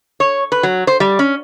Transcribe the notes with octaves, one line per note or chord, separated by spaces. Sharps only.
C#5
B4
F#3
C5
G3
C#4